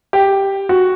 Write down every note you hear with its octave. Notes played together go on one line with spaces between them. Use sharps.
G4
F#4